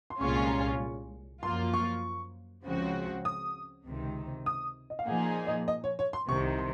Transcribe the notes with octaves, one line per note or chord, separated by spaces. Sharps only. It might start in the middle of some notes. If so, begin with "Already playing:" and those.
C6
C2 A#2 G#3 C#4 F4 C#6
C#6
A#5
C6
C#6
F#2 F3 A#3 F4 C6
C#6
C#2 C#3 F3 C4 F#4
D#6
C#2 C3 D#3
D#6
D#5
F5
A#2 F3 A#3 D#4 G#4 F#5
D#5
D#5
C#5
C#5
C6
C2 C3 D#3 C#6
C6